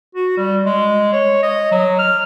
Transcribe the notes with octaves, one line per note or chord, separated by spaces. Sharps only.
F#4
G3
G#3
C#5
D#5
F#3
F6